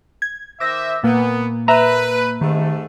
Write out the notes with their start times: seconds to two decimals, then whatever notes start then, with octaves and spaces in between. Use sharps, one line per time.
0.22 G#6
0.60 D#3 C5 E5 D6 E6 A#6
1.03 A#2 A#3 B3
1.68 B4 E5 A#5
2.41 G#2 C3 D#3 A3